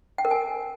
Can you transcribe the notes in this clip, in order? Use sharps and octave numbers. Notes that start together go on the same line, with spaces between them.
G5
A#4
G#5